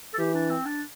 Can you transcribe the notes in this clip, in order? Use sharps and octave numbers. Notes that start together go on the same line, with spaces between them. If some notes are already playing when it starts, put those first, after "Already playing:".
A4
E3 G4
D4
C4
D4